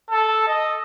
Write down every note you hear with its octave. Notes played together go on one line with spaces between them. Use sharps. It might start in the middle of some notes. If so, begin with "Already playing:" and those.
A4
D#5